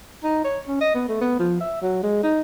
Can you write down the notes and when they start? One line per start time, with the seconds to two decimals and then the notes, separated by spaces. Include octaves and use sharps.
0.23 D#4
0.44 C#5
0.68 C#4
0.81 D#5
0.95 B3
1.08 A3
1.21 B3
1.39 F3
1.60 E5
1.82 F#3
2.03 G#3
2.23 D#4